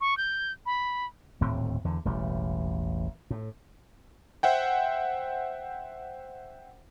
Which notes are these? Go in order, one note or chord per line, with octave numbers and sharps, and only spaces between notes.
C#6
G6
B5
D#1 D2 A2 C4
E2 D3
E1 A1 G3
A2
C5 E5 F#5 G5